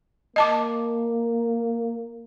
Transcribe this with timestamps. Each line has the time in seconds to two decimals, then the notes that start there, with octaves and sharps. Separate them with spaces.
0.36 A#3 D#5 A5 D6